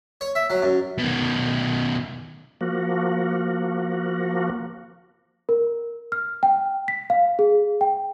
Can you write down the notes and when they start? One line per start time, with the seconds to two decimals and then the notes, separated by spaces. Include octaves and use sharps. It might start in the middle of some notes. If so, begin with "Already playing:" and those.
0.21 C#5
0.35 E5
0.50 F#3
0.62 F#2
0.98 B2 D#3
2.61 F3 A#3 F#4
5.49 A#4
6.12 F6
6.43 G5
6.88 B6
7.10 F5
7.39 G#4
7.81 G5